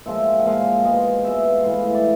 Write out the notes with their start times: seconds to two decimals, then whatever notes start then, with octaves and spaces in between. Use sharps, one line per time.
0.06 A#2 F3 G#3 E5
0.39 F#5
0.46 A#2 F3 G#3 F5
0.85 B2 G#3 D#5
1.24 B2 G#3 E5
1.44 F5
1.63 A2 E3 G#3 F5
1.84 E5
1.95 D5